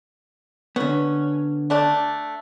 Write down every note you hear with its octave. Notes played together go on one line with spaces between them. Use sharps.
D3 B3 C#4
A3 D4 A5